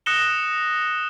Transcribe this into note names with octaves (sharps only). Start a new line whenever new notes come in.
D#6 F#6 A#6 C#7 E7 G7